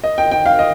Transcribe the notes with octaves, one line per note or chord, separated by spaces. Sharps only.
D#5
G5
G5
F5
D#5